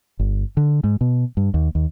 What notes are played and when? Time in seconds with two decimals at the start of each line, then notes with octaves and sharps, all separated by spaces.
0.19 G1
0.57 D3
0.84 G#2
1.01 B2
1.37 G2
1.54 D#2
1.75 D#2